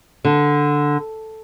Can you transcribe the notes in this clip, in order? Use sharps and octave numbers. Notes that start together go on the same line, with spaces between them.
D3